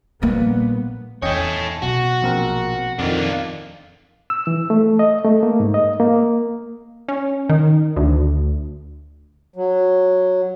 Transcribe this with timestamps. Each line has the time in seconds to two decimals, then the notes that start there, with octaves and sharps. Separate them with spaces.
0.22 A#1 G3 A#3 B3
1.22 E2 D#3 C#4 A4 C#5 D#5 G5
1.82 B2 F#3 F#4
2.22 A#1 C4 A#4
2.99 F2 D#3 D4 F4
4.30 E6
4.47 E3
4.70 A3
4.99 D#5
5.24 A3
5.43 A#3
5.60 G#2
5.74 D#5
6.00 A#3
7.08 C#4
7.49 D#3
7.96 D2
9.56 F#3